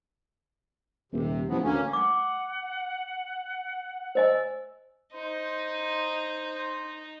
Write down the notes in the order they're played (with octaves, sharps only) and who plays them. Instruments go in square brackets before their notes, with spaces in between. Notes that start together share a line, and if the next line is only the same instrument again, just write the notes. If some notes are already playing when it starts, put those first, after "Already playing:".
[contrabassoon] D#1 [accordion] C3
[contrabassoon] A1 [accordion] F3 F#3 B3
[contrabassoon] D2 [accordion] A#3 C#4
[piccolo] F#5 [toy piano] D6
[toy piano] C5 D#5 G#5 [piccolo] E6
[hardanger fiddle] D#4 [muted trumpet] C5